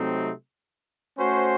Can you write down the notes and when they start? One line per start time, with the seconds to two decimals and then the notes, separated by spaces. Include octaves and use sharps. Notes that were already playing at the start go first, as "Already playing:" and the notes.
Already playing: C3 F#3 A3 C4 D#4
1.18 A3 C#4 F#4 C5